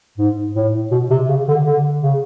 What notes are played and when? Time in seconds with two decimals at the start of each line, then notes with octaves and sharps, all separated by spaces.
0.18 G#2
0.55 A2
0.91 B2
1.10 C3
1.28 C#3
1.48 D3
1.66 D3
2.03 C#3